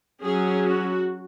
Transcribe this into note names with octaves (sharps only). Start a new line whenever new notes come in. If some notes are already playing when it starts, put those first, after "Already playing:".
F#3 C#4 G#4
F#4